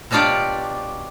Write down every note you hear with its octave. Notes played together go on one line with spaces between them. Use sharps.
B2 F#3 D4 F4 G4 D5